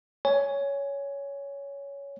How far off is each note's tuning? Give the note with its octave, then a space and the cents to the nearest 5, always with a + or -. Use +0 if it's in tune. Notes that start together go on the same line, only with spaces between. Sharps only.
C#5 +15 G#5 +0